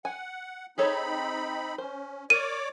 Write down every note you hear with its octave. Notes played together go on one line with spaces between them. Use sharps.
F#5 G#5
C4 D#4 G#4 A4 C#5 B5
C#4 C5
A#4 C#5 D5 D6 D#7